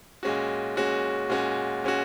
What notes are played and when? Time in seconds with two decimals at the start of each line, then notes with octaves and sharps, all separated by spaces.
0.23 A#2 G#3 C#4 F#4
0.76 A#2 G#3 C#4 F#4
1.29 A#2 G#3 C#4 F#4
1.84 A#2 G#3 C#4 F#4